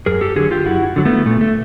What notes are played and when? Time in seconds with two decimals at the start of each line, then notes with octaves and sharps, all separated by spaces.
0.06 F#2 G#4 A#4
0.21 G4 A4
0.36 D3 F#3 F#4 G#4
0.51 F4 G4
0.65 F#2 E4 F#4
0.96 D3 F#3
1.05 A3 B3
1.26 A#2 A3
1.41 A3